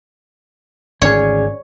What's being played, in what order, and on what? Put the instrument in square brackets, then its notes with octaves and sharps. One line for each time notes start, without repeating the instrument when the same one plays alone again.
[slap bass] G#1 [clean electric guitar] D2 C#4 G#4 [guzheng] C#5 [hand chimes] D5